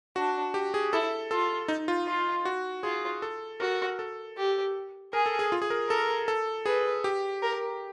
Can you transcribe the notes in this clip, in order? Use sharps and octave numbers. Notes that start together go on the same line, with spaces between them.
D4 F#4
G4
G#4
E4 A4
F4 A4
D#4
F4
F4
F#4
F4 G#4
A4
F#4 A#4
A4
G4
G#4 A#4
A4
G#4
F4
G#4
A#4
A4 A#4
A4
G#4 B4
G4
A#4